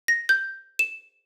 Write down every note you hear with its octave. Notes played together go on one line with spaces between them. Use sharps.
A#6
G6
E7